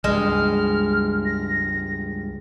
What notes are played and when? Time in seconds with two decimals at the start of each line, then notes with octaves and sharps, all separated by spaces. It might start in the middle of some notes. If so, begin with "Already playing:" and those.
0.04 C#2 G2 G#3 F6
1.25 A#6